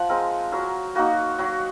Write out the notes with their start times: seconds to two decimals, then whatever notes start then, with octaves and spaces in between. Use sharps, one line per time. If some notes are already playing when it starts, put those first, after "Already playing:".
Already playing: F3 F#5
0.09 G#3 C4 A#4
0.52 F#3 A#4
0.95 A#3 D#4 F#4
1.38 F#3 F#4